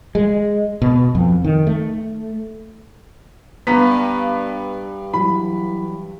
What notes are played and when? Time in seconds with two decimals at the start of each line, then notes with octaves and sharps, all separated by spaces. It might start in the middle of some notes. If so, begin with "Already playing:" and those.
0.15 G#3
0.82 B2
1.15 F2
1.44 D#3
1.67 A3
3.67 G2 B3 A#5 B6
5.14 E3 F#3 B5